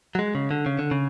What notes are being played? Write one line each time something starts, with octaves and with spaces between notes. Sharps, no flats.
F#3
G#3
C#3
D3
C#3
D3
C#3